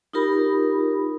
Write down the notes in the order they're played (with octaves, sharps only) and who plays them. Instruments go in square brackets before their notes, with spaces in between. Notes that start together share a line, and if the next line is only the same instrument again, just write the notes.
[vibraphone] D#4 F4 G4 A#4 B5